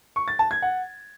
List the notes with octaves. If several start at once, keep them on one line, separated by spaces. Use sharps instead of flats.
C#6
A6
A5
G#6
F#5